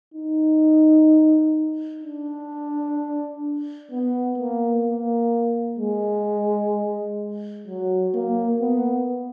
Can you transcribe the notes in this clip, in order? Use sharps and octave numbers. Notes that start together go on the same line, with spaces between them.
D#4
D4
B3
A#3
A#3
G#3
F#3
A#3
B3